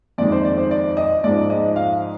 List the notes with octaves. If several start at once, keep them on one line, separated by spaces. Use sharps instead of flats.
F2 D#3 G#3 D5
C5
D5
C5
D5
D#5
G#2 F3 G#3 D5
D#5
F5